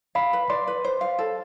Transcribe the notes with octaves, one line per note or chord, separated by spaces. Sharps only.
F5 B5
B4
D5 C6
B4
C5
F5
A4